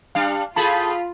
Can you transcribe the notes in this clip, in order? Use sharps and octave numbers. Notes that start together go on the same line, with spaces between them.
G3 D4 F5
A2 F4 G#4 A4 A5 B5